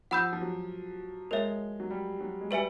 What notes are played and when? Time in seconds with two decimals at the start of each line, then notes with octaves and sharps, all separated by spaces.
0.11 F3 F#5 B5 E6 G6
0.33 F3
0.41 F#3
1.31 G#3 A#4 C#5 E5
1.80 F#3
1.90 G3
2.21 F#3
2.41 G#3
2.51 G3 G4 B4 E5 G#5